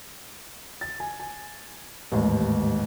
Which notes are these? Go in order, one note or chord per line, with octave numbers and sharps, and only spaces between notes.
A6
G#5
G#5
A1 D#2 G#2